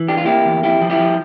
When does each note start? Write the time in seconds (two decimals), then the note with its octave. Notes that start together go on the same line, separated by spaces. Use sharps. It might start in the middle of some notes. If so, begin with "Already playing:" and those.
Already playing: E3
0.08 D4 G4
0.17 F4
0.26 A#3 E4 G4
0.45 E2
0.63 F2 E4 G4
0.82 F3
0.90 E4 G4
0.99 F3